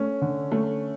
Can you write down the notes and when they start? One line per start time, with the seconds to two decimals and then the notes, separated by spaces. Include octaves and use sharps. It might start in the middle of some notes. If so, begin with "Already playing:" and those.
Already playing: A3 C#4
0.22 D3
0.52 A3 C#4